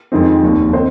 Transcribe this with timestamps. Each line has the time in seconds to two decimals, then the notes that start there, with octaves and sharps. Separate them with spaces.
0.12 F2 D#3 G#3 C4
0.43 F1 D#2 D#3
0.73 D#3 C4 D#4 C5